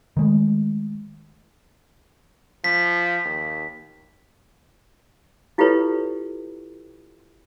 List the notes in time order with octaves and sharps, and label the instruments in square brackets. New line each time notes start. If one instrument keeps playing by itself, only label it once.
[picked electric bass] D#3 G#3 A3
[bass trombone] F3 [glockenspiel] B6
[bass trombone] D#2
[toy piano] E4 F4 G4 A4 B4 C#5